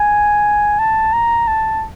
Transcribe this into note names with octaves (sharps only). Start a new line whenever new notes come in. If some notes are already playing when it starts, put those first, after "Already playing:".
Already playing: G#5
A5
A#5
A5